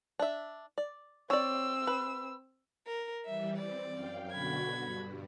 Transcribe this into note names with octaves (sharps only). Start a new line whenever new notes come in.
D4 E5
D5
C4 C#5 D5 E6
B4
A#4
E3 G3 E5
C4 D5
F#2 F5 G5
B2 D3 F#4 B5 G#6
G2